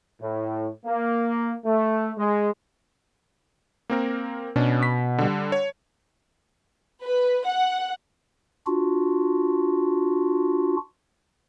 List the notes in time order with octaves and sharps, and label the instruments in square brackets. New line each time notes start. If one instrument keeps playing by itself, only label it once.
[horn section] A2
A#3
A3
G#3
[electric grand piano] A#3 C4 A#4
[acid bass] B2 [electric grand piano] C#4 D4
[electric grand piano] B6
D3 G3
C#5
[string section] B4
F#5
[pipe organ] D4 F4 F#4